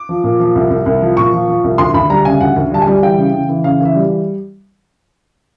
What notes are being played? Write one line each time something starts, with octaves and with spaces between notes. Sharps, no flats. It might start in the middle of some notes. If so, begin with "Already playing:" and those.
Already playing: D6
F3
A#2
F3
C2
C2
C2
F3
A#2 C#6
F3
F3
C2
D2 C6
D2 B5
G3 A#5
C#3 G#5
D2 F#5
D2
G3 A5
G#5
G3
E3 G5
C#3
C#3
E3
C#3 F5
E3 E5
G3